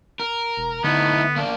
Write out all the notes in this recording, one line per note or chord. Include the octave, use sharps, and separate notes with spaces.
A#4
E1
D3 A3 B3 D#4 E4
A#3 D4